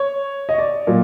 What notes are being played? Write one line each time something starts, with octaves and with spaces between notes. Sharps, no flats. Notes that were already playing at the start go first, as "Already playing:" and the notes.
Already playing: C#5
D#5
D5
A#2 F#3